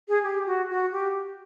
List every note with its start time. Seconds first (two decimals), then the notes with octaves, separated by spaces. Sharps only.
0.08 G#4
0.23 G4
0.46 F#4
0.70 F#4
0.92 G4